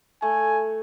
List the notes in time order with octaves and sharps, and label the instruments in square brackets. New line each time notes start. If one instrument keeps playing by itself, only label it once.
[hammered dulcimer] A3 [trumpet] G#5